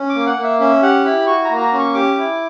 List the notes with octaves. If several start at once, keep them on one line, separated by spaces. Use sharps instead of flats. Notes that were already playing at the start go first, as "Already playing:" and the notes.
Already playing: C#4
D6
A#3
F#5
A#3
E5
C#4 E5
G4 F#5
E4 B5
F#4 C#6
A#5
A#3
A#5
C#4
C#6
G4 D6
E4